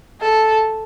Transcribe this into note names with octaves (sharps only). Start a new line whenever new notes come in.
A4